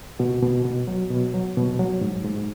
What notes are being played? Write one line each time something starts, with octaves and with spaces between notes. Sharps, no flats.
B2 F#4
B2
B2
F#3
B2
F#3
B2
F#3
G#2
G#2